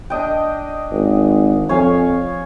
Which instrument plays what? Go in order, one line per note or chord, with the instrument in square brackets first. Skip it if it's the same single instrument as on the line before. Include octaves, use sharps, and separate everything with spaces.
[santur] D4 D#5 G5
[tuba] G#1
[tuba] F2 [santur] C#5 F5 G#5